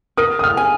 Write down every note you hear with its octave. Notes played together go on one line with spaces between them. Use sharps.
A#4 D#6
D#6
F6
G#5